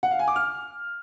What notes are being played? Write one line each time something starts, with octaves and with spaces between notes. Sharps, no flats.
F#5
F5
G#5
D6
F6